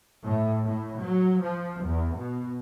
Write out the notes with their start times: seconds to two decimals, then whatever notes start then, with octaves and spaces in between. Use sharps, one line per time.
0.23 A2
0.63 A2
1.00 F#3
1.41 F3
1.81 E2
2.16 B2